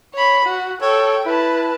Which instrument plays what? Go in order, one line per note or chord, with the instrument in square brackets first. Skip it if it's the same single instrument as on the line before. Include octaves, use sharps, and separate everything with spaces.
[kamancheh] C#5 B5
F#4
[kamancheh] A4 G5 [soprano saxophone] C#5
[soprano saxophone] E4 [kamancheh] B4 A5